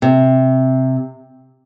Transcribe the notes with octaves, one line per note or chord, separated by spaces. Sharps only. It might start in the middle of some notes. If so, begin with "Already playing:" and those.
C3